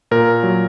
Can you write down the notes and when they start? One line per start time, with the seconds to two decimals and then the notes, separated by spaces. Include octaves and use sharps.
0.11 A#2 A#4
0.43 F#3